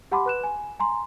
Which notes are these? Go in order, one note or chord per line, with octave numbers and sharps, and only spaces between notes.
G4 F#5 A5 B5 C6 D6
B4 F#6 E7
G#5
G#5 A#5 C6